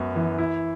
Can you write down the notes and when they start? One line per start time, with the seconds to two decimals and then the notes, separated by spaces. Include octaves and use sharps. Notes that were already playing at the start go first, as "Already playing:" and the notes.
Already playing: F#2 B3 F#4
0.16 E3
0.38 E4